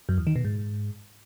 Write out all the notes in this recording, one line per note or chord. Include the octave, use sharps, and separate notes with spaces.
F#2
E2
D#3
B2
G#2